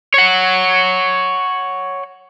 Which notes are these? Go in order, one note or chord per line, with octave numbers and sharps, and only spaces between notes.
C#5 F#5